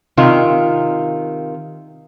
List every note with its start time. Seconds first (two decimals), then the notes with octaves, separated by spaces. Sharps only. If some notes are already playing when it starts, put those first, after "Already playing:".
0.17 C3 D#3 F4